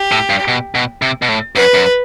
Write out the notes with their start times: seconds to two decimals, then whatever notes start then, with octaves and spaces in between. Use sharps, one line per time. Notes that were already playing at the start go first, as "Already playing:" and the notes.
Already playing: G4
0.12 A2
0.30 G2
0.48 B2
0.75 B2
1.02 C3
1.22 B2
1.29 A2
1.55 F#2 B4
1.74 F#2